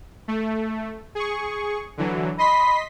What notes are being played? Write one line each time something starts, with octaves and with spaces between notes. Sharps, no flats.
A3
G#4 C#6
D3 E3 F#3
D#5 B5 C6 B6